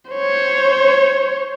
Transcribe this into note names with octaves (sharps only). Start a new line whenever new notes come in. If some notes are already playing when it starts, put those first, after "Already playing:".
C5 C#5